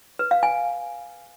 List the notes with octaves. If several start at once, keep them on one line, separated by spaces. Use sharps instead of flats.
B4
F5
G#5